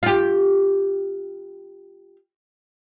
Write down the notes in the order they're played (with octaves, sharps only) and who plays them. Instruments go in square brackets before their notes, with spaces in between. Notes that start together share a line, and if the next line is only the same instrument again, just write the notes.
[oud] F4 G4